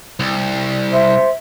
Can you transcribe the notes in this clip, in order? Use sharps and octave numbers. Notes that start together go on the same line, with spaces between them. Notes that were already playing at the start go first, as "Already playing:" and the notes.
C2
C5 E5